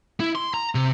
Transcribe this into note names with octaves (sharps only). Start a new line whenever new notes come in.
E4
C6
A#5
C3